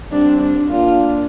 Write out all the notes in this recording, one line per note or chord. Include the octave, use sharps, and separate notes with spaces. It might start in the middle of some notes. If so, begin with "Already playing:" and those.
G3 C4 D4
D4
A#3 D4 F4